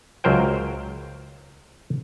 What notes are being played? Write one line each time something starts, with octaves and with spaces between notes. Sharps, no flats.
C#2 F#3 A#4 C5 G5